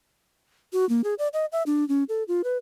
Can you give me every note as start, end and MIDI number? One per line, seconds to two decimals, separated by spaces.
0.73 0.88 66
0.89 1.01 58
1.04 1.14 68
1.19 1.28 74
1.33 1.46 75
1.52 1.63 76
1.66 1.87 62
1.89 2.04 61
2.09 2.23 69
2.28 2.42 65
2.44 2.58 71